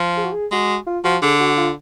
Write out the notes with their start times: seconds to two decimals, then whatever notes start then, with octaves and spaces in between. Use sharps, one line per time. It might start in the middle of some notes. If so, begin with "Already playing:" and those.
Already playing: F3
0.17 G#4
0.24 F#4
0.32 G#4
0.52 G#3 F#4
0.87 F4
1.04 F3 F#4
1.22 D3 G#4
1.40 F#4
1.57 F4